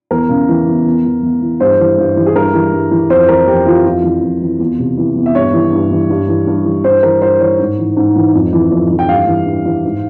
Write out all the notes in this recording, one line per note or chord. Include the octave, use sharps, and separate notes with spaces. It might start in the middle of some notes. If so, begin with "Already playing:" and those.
E2 A#4
C#3
E3
E2
E2
E3
E2
E3
G2 C5
E3
G2
E3
G#4
G2 A#4
E3
G2
E3
F2 C5
E3 A#4
F2 G4
E3 F4
F2 F4
E3
F2
E3
E2
C3
E3
E2
E5
G2 C#5
E3
G2
E3
G2
E3
G2
E3
G2 C5
E3 A#4
G2 C5
E3 C#5
G#2
E3
G#2
E3
F2
E3
F2
E3
G5
G2 F5
E3
G2
E3
G#2